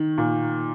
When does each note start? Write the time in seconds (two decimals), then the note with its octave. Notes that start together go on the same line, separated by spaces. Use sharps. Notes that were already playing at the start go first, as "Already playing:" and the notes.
Already playing: D#3
0.18 A#2